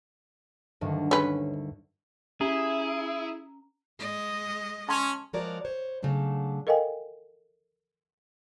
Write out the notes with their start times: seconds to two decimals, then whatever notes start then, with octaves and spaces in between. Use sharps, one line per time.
0.81 D2 G2 D#3
1.11 C#4 B4
2.41 C#4 E4 G#4 A#5
3.99 G#3 D#5
4.89 C#4 A5 C6
5.33 F3 G#3 F#4 A#4 C#5 D5
5.65 C5 C#5
6.03 C#3 F#3 A3 D4
6.67 A4 A#4 D#5 F5 G5 G#5